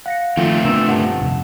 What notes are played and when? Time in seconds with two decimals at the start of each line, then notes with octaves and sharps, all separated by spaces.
0.06 F5 F#5 A#6 C#7
0.37 D#3 F3 A3 C4 F4
0.65 D3 B3 F4 A#4 E6 E7
0.88 G2 G3 F4 F#5 A5
1.22 F2 C3